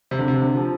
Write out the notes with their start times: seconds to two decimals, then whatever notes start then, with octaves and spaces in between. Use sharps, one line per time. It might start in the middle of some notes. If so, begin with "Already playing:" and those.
0.11 C3
0.19 D3
0.28 C3
0.42 D3
0.56 F3